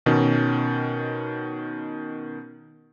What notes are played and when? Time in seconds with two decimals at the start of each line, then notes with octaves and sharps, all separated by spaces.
0.06 B2 D#3 C#4